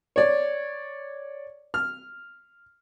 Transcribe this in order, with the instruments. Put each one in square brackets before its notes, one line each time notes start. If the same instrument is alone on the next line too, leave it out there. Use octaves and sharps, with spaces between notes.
[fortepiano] C#5 D5
F6